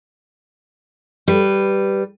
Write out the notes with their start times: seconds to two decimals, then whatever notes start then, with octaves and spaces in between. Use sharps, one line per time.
1.28 G3 B4